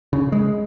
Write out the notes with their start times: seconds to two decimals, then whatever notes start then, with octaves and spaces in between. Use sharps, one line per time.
0.13 C#3
0.32 G#3